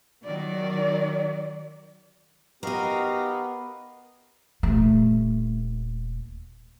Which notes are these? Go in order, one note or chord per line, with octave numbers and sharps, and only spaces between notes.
D#3 F#3 D5
B3 D#4 F#4 G4 A#4 D#5 F5
D#1 A3